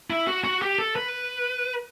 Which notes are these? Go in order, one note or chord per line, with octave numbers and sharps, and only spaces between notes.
E4
F#4
F#4
G4
A4
B4